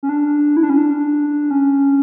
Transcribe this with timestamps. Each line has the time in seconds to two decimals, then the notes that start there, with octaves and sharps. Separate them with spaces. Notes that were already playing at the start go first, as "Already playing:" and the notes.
0.03 C#4
0.09 D4
0.57 E4
0.63 D4
0.70 C#4
0.77 D4
1.51 C#4